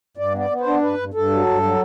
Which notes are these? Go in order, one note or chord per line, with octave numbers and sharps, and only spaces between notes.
G2 D5
B3 D5
B3
C5
D4
G2 B4
G2
G2 A4
F#3
G2
F#3